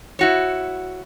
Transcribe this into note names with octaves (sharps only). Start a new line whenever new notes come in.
E4 F#4 C#5